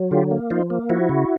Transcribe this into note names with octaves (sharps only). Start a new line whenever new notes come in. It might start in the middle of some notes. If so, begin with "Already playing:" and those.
Already playing: F#3
D3 F4 G4
A#3
F3 D#4 F4
A#3
F3 E4 F#4
C#3